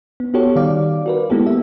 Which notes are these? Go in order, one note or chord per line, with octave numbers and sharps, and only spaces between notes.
B3
B3 F#4 G4 A4 C#5
D#3 G3 D5 F5 D6
F#4 A#4 B4
G#3 A#3 B3 E4 G4 A4
E5